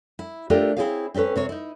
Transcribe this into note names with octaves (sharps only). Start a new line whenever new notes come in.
E4
A3 D4 F4 G4 A4 A#4
C4 E4 G4 G#4 C#5 F5
C4 C#4 A4 B4 C#5
C3 C4 C#5
D#4 E4